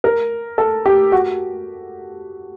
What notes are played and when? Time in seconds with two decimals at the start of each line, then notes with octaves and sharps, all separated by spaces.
0.04 A#4
0.58 A4
0.86 G4
1.12 F#4